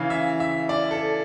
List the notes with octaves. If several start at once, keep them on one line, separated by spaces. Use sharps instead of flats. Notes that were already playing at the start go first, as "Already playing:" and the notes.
Already playing: C#3 E3 F5
E5
E5
D5
A4